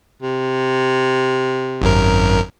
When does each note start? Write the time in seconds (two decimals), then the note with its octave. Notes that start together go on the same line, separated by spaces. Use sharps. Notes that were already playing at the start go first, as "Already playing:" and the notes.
0.22 C3
1.82 G#1 F#2 A#4